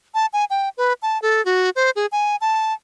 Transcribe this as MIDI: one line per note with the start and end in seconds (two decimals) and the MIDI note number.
0.14 0.26 81
0.33 0.45 80
0.50 0.69 79
0.77 0.93 71
1.02 1.21 81
1.22 1.44 69
1.45 1.70 66
1.76 1.90 72
1.96 2.06 68
2.12 2.36 80
2.41 2.74 81